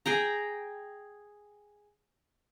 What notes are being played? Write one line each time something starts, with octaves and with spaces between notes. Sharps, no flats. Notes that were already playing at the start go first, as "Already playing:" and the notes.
G#4 G5 A#5